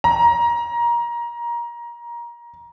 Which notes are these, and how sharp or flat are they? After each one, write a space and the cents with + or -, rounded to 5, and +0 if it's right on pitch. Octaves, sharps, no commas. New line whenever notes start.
A#5 +20